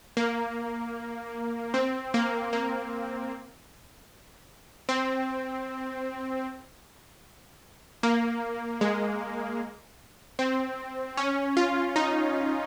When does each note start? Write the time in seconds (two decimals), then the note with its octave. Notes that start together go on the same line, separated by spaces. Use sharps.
0.17 A#3
1.74 C4
2.14 A#3
2.53 A#3
4.89 C4
8.03 A#3
8.81 G#3
10.39 C4
11.17 C#4
11.57 F4
11.96 D#4